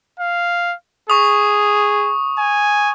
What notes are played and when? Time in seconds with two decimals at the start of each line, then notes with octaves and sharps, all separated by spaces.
0.19 F5
1.10 G#4 C#6 D#6
2.38 G#5